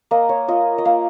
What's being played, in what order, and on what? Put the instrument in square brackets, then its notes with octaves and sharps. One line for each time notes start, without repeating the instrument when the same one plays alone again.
[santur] A#3 D#5
C#5
F4 D#5
D#5
A#3 F5